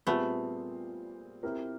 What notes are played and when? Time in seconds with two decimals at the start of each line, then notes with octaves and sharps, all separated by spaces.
0.07 A#2 G3 A3 B3 C4 F4 G#4
1.43 C4 E4 G4 A#4